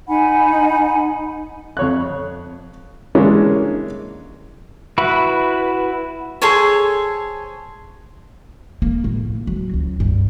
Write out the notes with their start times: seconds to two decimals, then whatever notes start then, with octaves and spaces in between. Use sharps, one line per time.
0.07 D#4 F#5 G#5 B5
1.77 F2 C#5 F#6
3.15 E3 G#3 A#3 C#4 D4
4.98 E4 F#4 B4
6.42 G#4 A4 C5 C#5
8.82 A#3
9.04 A2
9.47 F#3
9.74 C#2
10.00 G2